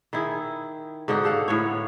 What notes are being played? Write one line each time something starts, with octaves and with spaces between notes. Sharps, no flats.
D#3 E4 G#4
G#2 D3 D#4 F#4
G4 A4 F5 F#5
A2 B3 C#5